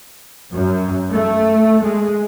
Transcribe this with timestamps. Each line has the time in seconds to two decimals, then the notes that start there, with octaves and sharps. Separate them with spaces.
0.52 F#2
1.12 A3
1.85 G#3